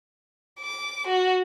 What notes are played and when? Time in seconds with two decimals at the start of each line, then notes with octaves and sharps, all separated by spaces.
0.60 D6
1.07 F#4